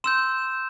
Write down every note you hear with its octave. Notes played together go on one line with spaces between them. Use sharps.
C6 E6 G6 E7